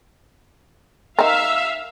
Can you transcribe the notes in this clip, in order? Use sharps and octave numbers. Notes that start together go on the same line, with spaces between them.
D#4 A#4 E5 F5